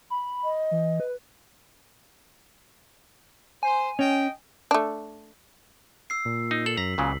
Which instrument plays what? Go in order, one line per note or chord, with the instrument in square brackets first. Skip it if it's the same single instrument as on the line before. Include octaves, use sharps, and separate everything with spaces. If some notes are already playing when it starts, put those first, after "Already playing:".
[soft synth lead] B5
[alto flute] D#5
[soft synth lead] E3
B4
[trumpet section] C5 [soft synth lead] G#5
[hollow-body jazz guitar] C#4 [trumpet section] D#5 G5
[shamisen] A3 D4
[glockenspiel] E6 C7
[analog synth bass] A#2
[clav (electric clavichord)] D#4
[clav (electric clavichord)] A4 [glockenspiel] F#7
[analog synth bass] F#2 [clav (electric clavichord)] A#5 [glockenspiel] B6
[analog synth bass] C#2 [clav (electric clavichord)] A#2 C#3 F#3